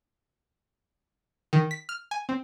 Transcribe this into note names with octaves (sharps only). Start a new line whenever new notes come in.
D#3
B6
F6
G#5
C4